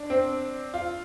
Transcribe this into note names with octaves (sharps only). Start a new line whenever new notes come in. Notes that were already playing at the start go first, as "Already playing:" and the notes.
Already playing: D4
C4
F4